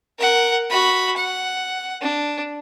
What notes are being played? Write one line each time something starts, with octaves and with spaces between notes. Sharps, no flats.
A#4 F#5
F#4 B5
F#5
D4